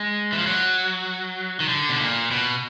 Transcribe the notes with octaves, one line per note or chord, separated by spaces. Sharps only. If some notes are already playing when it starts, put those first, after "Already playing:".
Already playing: G#3
E3
F3
F#3
D#3
D3
B2
A#2
B2